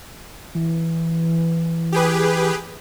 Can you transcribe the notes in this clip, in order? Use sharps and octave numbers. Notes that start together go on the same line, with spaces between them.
E3
G4 G#4 B4